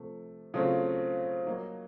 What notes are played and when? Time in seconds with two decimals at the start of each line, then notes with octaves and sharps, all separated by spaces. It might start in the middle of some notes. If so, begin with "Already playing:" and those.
Already playing: C3 F3 A3
0.54 C#3 F#3 A3 C4 F4
1.46 F#3 A#3 D#4